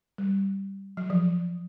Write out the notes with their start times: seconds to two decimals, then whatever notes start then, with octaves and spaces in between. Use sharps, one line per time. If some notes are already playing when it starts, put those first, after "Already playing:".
0.18 G3
0.97 F#3
1.10 F3